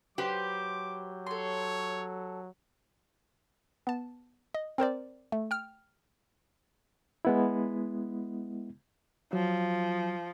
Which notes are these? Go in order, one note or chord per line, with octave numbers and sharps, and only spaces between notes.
F#3 G4 B4 C5 D6
A4 C#5 C6
B3 A5
D#5
C4 A#4 C5 D5
A3
G5 F6
G#3 B3 E4
F3 F#3